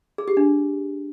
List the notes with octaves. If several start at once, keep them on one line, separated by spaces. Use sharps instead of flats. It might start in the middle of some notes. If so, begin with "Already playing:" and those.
G#4
G4
D4